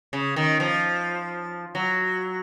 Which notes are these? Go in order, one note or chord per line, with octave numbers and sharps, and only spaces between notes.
C#3
D#3
F3
F#3